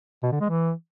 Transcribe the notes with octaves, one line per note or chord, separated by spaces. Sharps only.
B2
D3
G#3
E3